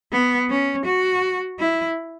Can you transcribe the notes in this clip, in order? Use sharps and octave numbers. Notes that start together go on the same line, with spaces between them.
B3
C#4
F#4
E4